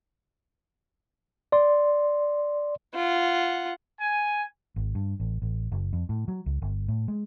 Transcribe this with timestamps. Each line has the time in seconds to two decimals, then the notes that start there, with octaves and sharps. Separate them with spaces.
1.52 D5 C6
2.95 F4 F#5
4.00 G#5
4.76 G#1
4.95 G2
5.20 A1
5.42 A1
5.72 F#1
5.93 F2
6.09 A2
6.28 F#3
6.46 C#2
6.62 G1
6.88 A2
7.08 G#3